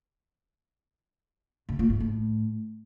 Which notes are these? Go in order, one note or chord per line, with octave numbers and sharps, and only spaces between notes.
C#3
A#2
G#2
A2